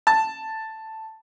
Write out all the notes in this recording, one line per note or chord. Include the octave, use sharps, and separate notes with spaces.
A5